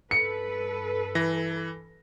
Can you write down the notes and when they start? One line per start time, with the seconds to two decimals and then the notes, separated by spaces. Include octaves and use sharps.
0.11 G2 A4 B4 C#7
1.15 E3 A#6